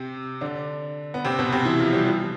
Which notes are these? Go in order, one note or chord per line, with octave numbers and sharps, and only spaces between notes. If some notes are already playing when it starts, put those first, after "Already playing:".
Already playing: C3 C4
D3 D4
B3
C3 C4
B2 B3
C3 C4
E3 E4
F3 F4
G3 G4
F3 F4